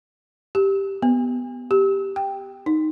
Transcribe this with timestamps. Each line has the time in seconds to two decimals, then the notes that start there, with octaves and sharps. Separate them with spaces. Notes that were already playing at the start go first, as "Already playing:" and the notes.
0.55 G4
1.02 B3
1.71 G4
2.16 G5
2.66 D#4